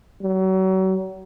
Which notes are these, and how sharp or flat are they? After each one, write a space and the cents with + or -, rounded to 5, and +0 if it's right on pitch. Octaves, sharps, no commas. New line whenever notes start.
F#3 +35